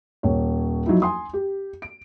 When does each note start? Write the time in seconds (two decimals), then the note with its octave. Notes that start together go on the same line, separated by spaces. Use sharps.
0.23 D#1 C#5
0.86 F3 F#3 D#4 E4
1.02 G#5 C6 D#6
1.33 G4
1.82 D7